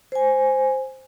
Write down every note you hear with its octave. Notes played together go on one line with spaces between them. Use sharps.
C5 G#5